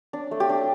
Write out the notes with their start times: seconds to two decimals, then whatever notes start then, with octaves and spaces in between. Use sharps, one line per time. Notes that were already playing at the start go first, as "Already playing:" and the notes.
0.13 D4
0.31 A3
0.40 G4
0.49 D4